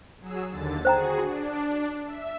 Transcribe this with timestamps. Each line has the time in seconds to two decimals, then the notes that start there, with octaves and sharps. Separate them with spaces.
0.21 F#3 G#4 E6
0.50 D#2 D3 A6
0.85 F#4 G#4 C5 G5 A#5
1.18 D4 F#4
2.06 E5